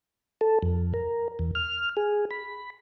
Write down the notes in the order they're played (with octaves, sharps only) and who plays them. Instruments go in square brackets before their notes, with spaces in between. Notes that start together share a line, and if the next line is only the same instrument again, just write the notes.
[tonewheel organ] A4
F2
A#4
E2
F6
G#4
B5